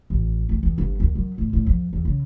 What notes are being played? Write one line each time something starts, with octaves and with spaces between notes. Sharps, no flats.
A1
D2
E2
G1
D#2
F#2
A2
A2
F2
E2
C#3